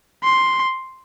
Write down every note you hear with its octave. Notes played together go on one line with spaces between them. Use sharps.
C6